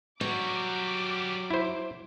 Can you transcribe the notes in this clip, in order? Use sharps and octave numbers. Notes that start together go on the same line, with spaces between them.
F#3 G3 F#4 D6
E4 C5